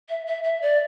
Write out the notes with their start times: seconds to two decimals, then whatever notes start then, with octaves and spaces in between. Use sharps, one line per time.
0.09 E5
0.27 E5
0.43 E5
0.62 D5